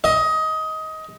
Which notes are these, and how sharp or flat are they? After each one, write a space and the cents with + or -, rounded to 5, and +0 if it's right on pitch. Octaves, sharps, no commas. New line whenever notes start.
D#5 +20